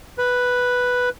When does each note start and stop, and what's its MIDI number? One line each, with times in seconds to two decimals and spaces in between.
0.18 1.09 71